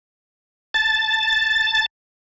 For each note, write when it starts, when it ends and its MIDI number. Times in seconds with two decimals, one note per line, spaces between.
0.74 1.86 81
0.74 1.86 93